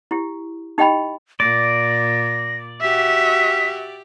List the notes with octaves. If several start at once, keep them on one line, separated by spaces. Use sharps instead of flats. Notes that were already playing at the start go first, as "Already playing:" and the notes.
E4 G4
D#4 G4 D#5 G5 B5
A#2 D5 A#6
F#4 G4 E5 B6